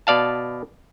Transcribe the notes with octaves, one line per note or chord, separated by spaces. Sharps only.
B2 D5 F5 A5